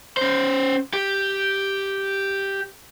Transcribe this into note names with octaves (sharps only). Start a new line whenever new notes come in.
C#4 C5
G4